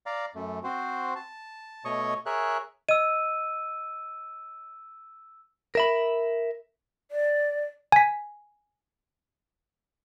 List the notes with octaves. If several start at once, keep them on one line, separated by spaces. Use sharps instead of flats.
D5 F5 A#5
F#2 A3
C4 F#4 C5
A5
B2 A3 C#5 D#5 C#6 D#6
G#4 A#4 C#5 E5 F#6
D#5 E6 D#7
A#4 E5 B5
D5
G#5 B6